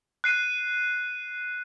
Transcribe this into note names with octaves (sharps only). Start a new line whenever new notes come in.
F#6 C7 D#7